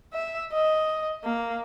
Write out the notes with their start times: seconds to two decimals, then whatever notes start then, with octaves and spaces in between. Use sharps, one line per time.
0.14 E5
0.52 D#5
1.24 A#3